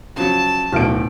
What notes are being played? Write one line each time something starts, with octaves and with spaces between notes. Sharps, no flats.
C#3 F3 F#3 A5
D1 B1 D3 F#4 F6 D7